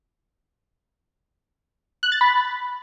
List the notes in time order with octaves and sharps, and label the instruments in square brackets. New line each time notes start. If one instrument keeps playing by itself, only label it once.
[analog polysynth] F#6
A6
B5